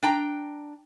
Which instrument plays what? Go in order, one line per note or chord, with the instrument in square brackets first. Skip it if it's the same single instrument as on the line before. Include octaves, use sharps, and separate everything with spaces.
[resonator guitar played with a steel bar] D4 G5 A#5